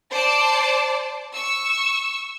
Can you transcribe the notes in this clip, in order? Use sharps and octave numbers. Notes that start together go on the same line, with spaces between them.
C5 D5 A5 D6
C#6 E6